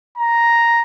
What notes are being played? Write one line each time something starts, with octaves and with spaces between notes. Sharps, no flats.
A#5